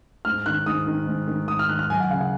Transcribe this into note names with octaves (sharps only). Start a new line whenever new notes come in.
G#2 F6
D#3 F#6
G#2 D#6
D#3
G#2
D#3
G#2 D#6
F6
D#3 F#6
F6
F#2 G#5
F#5
C#3 F5
F#5